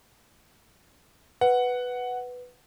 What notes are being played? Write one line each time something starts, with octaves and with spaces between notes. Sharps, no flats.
B4 F#5